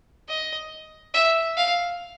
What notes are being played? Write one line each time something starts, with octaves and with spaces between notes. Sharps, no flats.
D#5
E5
F5